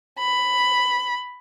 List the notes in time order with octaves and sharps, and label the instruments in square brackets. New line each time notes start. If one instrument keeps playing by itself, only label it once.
[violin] B5